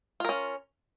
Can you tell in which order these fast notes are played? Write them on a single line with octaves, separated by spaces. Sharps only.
F4 A#4 C#4